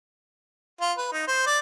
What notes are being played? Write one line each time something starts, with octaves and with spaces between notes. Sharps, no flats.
F4
B4
D#4
C5
D5